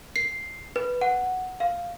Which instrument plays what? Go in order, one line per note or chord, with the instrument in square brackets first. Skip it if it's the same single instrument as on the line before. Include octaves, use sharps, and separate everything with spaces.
[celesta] C7
B4
F#5
F5